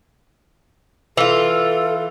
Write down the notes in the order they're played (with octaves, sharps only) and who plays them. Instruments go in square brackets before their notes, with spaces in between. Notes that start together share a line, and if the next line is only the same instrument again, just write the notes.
[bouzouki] E3 F4 [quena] A4